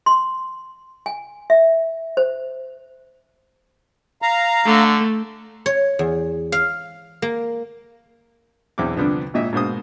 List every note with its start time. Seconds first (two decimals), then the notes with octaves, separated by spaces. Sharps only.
0.06 C6
1.06 G#5
1.50 E5
2.17 C5
4.22 F5 A#5
4.66 D3 A3
5.66 C#5
5.99 E2
6.52 F5
7.22 A#3
8.78 B1 E2 C4 E4 D6
8.96 C2 D3 F3 B3 C4 D4
9.34 G#1 A#2 D#5 E5
9.53 G#2 B2 A#3 C5 D#6